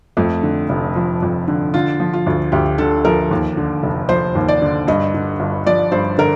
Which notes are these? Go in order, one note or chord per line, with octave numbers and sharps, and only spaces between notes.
F2 A3
D3
F1
F3
F2
D3
D3 F4
F3
F4
D2
D2 G4
D3 A4
F3 A#4
D#2
D3
F1
F3 C5
D#2
D5
D3
G2 D#5
D3
G1
F3 D5
G2 C5
D3 A#4